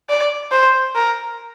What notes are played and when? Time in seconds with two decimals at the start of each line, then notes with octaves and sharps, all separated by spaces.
0.10 D5
0.52 C5
0.95 A#4